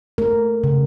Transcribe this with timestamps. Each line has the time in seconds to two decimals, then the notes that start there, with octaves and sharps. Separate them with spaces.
0.18 A3 A#4
0.64 C#3